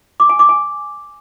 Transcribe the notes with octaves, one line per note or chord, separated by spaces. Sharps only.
D6
G#5
D6
G#5